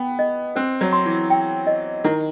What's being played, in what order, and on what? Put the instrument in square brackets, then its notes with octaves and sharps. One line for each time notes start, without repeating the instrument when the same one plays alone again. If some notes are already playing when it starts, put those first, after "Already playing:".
Already playing: [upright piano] B3 [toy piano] G5
[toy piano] D#5
[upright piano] C4 [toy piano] C5
[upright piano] F#3
[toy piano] C6
[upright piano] E3
[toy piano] G5
D#5
[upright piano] D#3 [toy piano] E4